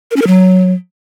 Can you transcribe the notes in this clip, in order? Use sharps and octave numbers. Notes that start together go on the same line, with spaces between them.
A#4
C#4
A#4
F#3